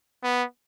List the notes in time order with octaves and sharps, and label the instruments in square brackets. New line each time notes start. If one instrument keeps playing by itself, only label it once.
[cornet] B3